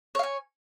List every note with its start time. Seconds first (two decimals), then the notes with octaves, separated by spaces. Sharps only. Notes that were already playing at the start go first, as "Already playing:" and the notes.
0.15 C#5
0.19 F5
0.23 G#5